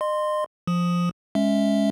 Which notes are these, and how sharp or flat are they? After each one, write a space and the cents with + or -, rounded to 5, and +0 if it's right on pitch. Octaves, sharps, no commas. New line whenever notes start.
D#5 -35 C6 +0
F3 +0 D#6 +0
G#3 +0 C#4 +0 E5 -5